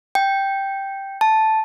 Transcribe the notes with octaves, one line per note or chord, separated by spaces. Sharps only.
G5
A5